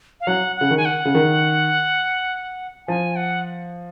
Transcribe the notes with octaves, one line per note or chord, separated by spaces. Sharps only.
F5
F#3 F#5
C#3 F#5
D#3
G#5
F#5
C#3
D#3
F3 G#5
F#5